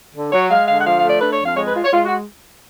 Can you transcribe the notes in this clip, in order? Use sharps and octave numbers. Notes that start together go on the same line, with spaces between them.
D3
F#3 C#5
G#3 F5
D3 F5
F#5
F3 F5
F5
A3
D5
D4 B4
C#5
F2
F5
G#3 C#5
B4
F4
C#5
G#3 F4
F#4